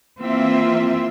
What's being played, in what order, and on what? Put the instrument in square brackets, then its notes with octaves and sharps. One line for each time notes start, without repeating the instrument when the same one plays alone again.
[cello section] E3 A#3 C4 F4 E5